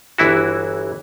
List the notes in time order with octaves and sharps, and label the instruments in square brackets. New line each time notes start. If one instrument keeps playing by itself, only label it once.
[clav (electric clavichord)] G1 E3 E4 F#4